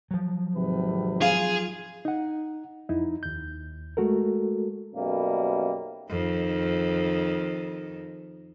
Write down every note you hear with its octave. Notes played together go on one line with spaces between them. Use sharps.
F3 F#3
G#1 C3 B4
F4 G#4
D#4 F#5
F2 D#4 E4
D#2 G6
G#3 A3 F#4 A4 A#4
B1 F#2 B2 G3 A#3
F2 D#3